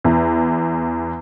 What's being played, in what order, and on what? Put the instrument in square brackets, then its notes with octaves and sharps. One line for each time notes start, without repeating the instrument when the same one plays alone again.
[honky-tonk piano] E2